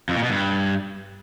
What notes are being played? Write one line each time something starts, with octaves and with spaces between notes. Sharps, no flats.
F2
A#2
B2
G2